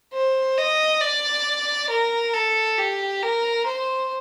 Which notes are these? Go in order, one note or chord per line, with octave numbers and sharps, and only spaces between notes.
C5
D#5
D5
A#4
A4
G4
A#4
C5